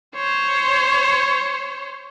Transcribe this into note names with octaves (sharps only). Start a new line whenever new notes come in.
C5 C#5